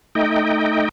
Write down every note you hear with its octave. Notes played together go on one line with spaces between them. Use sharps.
A3 D#4 D#5 G5